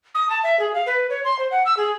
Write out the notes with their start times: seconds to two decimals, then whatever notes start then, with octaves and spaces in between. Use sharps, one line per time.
0.15 D#6
0.30 A5
0.44 E5
0.60 G#4
0.74 F5
0.86 B4
1.10 C#5
1.25 C6
1.39 C5
1.51 F#5
1.66 E6
1.77 G#4